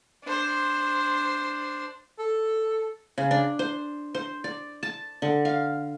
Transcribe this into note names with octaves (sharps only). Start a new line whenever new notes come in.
D4 C5
A4
C#3
D4
C5
C5
D5
A5
D3
F5